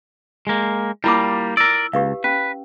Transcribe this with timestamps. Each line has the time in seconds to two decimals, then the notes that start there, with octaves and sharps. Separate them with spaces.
0.47 G#3 A#3
1.04 G3 A#3 E4 F4 D6
1.57 A#4 D5 E6
1.93 C#2 G4 B4 F5
2.24 C#4 B4